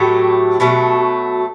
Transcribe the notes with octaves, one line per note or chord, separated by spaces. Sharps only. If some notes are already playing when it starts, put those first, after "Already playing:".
Already playing: A2 F#3 A3 G4
B2 F#3 A3